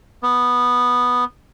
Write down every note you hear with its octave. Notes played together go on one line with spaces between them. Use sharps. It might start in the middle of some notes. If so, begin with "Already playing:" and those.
B3